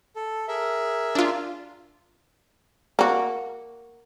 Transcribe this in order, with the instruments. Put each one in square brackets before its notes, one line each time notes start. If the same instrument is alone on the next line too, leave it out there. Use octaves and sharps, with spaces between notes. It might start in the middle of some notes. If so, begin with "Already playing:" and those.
[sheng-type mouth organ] A4
G#4 A#4 E5
[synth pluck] D4 F4
[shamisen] A#3 F#4